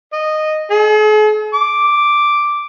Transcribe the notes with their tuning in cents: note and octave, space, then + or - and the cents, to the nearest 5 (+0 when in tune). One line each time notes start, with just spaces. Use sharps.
D#5 -10
G#4 +45
D6 +0